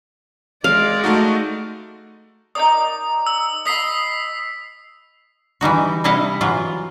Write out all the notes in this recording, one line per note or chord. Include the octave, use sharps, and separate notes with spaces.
G#3 D5 F5
A3 D#4 F#4
D#4 A#4 D5 D#6
E6
D#5 B5 D#6 B6 C7
E3 G3 D#4 F#4
C3 G3 E4 D#5 F5 F#5
E3 F#3 F4